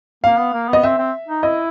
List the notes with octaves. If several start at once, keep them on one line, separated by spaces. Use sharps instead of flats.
A#3 F5
B3
A#3
B3
D#5
C4 E5
C4
D#4
E4 D#5